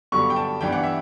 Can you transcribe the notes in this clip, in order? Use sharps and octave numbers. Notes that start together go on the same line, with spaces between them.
G2 D3 F#3 B3 C#6
G5
A5
G2 E3 B3 D4 G5
F#5
E5